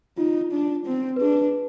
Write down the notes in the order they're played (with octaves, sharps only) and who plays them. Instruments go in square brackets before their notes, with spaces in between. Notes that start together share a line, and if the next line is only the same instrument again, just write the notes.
[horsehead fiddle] D#4 [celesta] F4
[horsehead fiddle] D4
C4
[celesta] B4
[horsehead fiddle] D4 [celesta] G#4